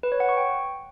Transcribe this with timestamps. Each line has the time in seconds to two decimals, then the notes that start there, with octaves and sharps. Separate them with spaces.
0.03 B4
0.12 C#5
0.20 F#5
0.29 C#6
0.37 G5